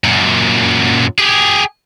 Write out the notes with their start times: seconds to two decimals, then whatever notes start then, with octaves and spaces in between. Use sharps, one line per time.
0.04 F#2 A#2
1.18 G4 G#4